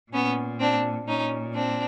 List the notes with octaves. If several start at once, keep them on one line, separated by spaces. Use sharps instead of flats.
A#2 B3 C#4
C4 D4
A#2 C#4 D#4
C4 D4